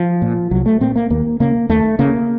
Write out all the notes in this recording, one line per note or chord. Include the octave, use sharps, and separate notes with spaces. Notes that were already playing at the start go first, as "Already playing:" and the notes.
Already playing: F3
A#2
C2 F#3
A3
A#2 C4
A#3
D#2 A#3
C#3 A#3
D#2 A3
C#3 A#3